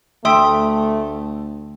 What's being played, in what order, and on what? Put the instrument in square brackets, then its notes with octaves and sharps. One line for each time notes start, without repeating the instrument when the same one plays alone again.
[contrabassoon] D2 [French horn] A3 [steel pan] E5 [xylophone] G5 C6 D#6